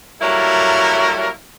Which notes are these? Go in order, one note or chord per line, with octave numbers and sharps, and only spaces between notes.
F#3 G3 A#3 E4 A4 A#4